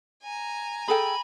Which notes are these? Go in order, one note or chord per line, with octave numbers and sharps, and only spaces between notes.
G#5 A#5
G#4 A4 G5 B5